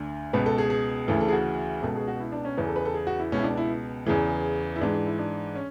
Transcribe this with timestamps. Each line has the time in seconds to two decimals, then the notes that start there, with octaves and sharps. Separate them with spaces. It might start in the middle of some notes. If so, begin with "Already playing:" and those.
Already playing: D2 D3
0.33 C#2 B2 B4
0.46 A4
0.58 G#4
0.70 G#4
1.08 D2 C#3 E3 A4
1.20 A4
1.28 G#4
1.32 F#4
1.82 C#2 B2 A4
1.96 G#4
2.07 F#4
2.20 E4
2.32 D4
2.45 C#4
2.57 E2 C#3 E3 B4
2.67 A4
2.76 B4
2.85 A4
2.94 G#4
3.07 F#4
3.19 E4
3.32 C#2 B2 C#4
3.39 E4
3.44 D4
3.57 E4
4.06 E2 C#3 E3
4.76 E4
4.81 G#2 E3 D4
4.94 D4
5.07 E4
5.19 D4
5.55 C#4